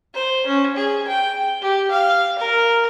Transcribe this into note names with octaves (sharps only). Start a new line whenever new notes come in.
C5
C#4
G#4
G5
G4
F5
A#4